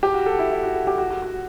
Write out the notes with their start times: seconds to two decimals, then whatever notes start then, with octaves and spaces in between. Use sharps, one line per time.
0.03 G4
0.14 F#4
0.26 A4
0.39 E4
0.51 E4
0.63 F#4
0.74 A4
0.87 G4
0.98 F#4
1.10 F#4
1.22 F#4